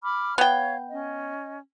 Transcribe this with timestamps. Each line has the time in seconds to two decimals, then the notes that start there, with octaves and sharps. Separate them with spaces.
0.04 B5 D6 F6
0.38 B3 C#5 F5 G5
0.90 C#4 D#5